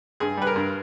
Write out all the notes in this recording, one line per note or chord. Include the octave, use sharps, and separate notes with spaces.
G2 G#4
G3 B4
A#4
G2